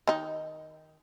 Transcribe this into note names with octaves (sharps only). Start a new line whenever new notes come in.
D#3 D#4